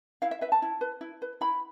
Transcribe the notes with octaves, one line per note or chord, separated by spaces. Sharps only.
E4 F5
E5
B4 E5
A5
E4
B4
E4
B4
E4 B5